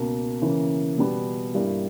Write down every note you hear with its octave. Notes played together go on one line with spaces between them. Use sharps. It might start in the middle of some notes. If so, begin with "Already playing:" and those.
Already playing: C#2 B2 A#3
C#3 E3 A#3
B2 G3 B3
G2 G3 A#3 E4